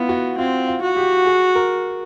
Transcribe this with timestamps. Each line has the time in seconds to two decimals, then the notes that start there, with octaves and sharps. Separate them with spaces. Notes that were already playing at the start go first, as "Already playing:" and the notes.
Already playing: B3 E4 F4
0.09 F#4
0.38 C4 F4
0.67 F4
0.82 F#4
0.96 G4
1.26 G#4
1.55 A#4